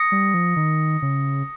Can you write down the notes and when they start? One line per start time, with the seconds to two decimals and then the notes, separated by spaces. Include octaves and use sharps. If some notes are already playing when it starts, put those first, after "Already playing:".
Already playing: D#6 A#6 C#7
0.12 G3
0.34 F3
0.56 D#3
1.02 C#3